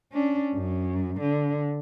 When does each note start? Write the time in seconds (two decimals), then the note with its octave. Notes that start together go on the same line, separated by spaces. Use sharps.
0.12 C#4 D4
0.55 F#2
1.20 D3